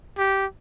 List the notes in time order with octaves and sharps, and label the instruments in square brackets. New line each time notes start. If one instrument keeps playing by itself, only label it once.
[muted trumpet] G4